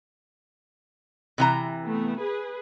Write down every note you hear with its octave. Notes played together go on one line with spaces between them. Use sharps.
C3 E3 A#5
A3 B3
G#4 B4